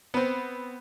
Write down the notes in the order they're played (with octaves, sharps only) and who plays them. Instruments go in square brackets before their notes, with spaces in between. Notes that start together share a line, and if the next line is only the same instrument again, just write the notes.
[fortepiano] B3 C4